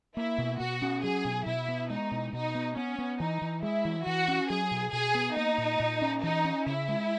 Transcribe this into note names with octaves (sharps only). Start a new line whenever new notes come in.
A#3 E4
B2
B2 F#4
C#4
F#3 G#4
B2
B2 E4
B3
G#3 D#4
B2
B2 D#4
B3
B3 C#4
B3
E3 D#4
E3
G#3 E4
E3
E3 F#4
C#4
F#3 G#4
B2
B2 G#4
B3
A#3 D#4
A#2
A#2
C#4
E3 D#4
C#4
C#3 E4
G#3